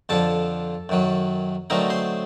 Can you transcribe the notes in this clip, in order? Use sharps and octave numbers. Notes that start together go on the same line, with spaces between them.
F2 D3 F3 A4 A5
F#2 D#3 F#3
D3 F#3 A3 C4 D#4 A#4 A#5
C5 C6